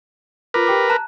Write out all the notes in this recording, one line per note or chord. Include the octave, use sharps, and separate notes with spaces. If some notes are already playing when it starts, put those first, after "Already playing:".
F4 A#4 B4 D6
G4 G5 D6
A5 A#5 F#6